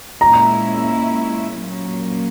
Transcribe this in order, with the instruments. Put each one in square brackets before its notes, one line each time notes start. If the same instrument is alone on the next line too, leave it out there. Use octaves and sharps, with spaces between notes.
[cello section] A#2 G#3 C#4 E4 [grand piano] A#5
[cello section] A#2 F#3 A#3 C#4